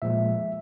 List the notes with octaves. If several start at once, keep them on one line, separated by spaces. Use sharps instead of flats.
A#2 F3 G#3 E5